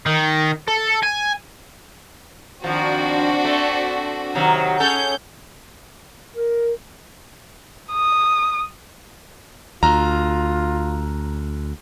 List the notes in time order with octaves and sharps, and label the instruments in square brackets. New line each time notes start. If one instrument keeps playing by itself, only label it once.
[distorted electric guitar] D#3
A4
G#5
[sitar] D#3 F3 [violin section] C4 D4 F#4
[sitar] A3
C3 D#3 F#3
[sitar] C#4 A4 [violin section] G#4 G6
[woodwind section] A#4
[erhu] D#6
[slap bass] D2 [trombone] F4 [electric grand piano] A#5